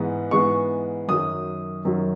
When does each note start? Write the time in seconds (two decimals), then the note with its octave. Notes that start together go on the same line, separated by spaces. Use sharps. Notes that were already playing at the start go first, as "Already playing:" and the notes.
Already playing: G#2 E3 G#3 B3
0.31 G#2 E3 G#3 B3 C#6
1.08 F#2 D#3 F#3 D#6
1.85 F#2 D#3 F#3